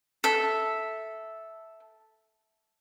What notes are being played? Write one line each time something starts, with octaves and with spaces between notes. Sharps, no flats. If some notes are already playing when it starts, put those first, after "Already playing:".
A4 E5